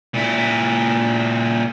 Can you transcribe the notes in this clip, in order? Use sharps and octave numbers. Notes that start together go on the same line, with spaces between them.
A#2 E4